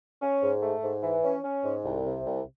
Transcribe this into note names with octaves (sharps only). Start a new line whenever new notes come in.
C#4
G#2
A3
G#2
E3
C#4
C#4
G#2
C2
C3
C2